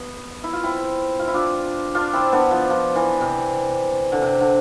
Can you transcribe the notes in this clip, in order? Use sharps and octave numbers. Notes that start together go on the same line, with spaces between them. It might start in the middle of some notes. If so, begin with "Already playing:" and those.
Already playing: B3
E4
F4
C4 E4
F4
E4
D4 F4
D4 F4
C4 E4
B3 D4
F3
F3
E3
C3
D3
C3
D3